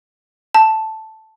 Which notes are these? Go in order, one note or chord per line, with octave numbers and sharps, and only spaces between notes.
A5